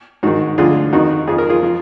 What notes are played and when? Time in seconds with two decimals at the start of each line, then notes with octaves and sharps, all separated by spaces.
0.23 G#2 D#3 D#4 F#4
0.58 D2 D3 F3 F4 G#4
0.93 F2 D#3 D#4 F#4
1.27 F2 F3 G#4
1.38 A#4
1.49 F4 G#4
1.63 F3